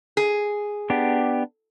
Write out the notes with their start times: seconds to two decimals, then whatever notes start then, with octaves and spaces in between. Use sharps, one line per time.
0.17 G#4
0.90 B3 D4 G4